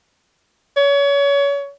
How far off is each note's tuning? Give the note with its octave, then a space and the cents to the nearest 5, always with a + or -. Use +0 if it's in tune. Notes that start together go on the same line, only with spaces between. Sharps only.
C#5 +30